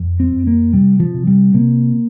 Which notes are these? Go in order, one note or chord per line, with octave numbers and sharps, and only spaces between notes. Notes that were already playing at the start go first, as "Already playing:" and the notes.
Already playing: F2
C4
F2
A#3
C3 G3
F3
C3
G3
C3 A#3